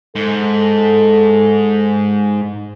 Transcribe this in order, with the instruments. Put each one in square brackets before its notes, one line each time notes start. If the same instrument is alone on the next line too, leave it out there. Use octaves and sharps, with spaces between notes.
[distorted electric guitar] G#2 [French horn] A4